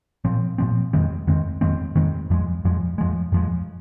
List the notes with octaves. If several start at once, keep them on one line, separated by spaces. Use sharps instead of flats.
A#2 F3 C4
A#2 F3 C4
F2 D#3 G#3 C4
F2 D#3 G#3 C4
F2 D#3 G#3 C4
F2 D#3 G#3 C4
F2 F3 G#3
F2 F3 G#3
F2 F3 G#3
F2 F3 G#3